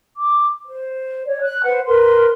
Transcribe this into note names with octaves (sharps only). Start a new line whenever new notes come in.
D6
C5
C#5 D5
F#6
B4 C5 F#5
A#4 B4 C6